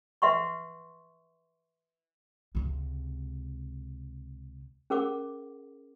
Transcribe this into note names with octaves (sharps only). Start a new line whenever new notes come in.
B4 E5 F#5 C6 C#6
C#2 C3
C#4 G#4 A#4 F#5 D6